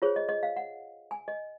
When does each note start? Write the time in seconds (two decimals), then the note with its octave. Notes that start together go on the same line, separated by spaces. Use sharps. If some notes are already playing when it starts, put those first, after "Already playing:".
0.02 F4 G#4 C5 C#5
0.16 D#5
0.29 D#5
0.43 F5
0.56 F#5
1.11 G#5
1.28 D#5